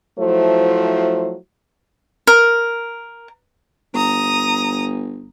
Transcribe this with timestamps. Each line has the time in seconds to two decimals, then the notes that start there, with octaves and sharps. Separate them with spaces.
0.18 F3 F#3 A3 E4 C5
2.27 A#4
3.94 G1 A#5 D#6